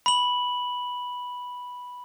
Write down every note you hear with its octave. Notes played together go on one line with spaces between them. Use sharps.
B5 F#7